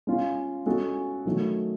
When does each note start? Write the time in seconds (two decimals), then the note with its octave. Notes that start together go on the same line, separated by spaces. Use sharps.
0.07 G#3 C#4 F4
0.66 G#3 C#4 F#4 A4
1.25 D#3 F#3 A3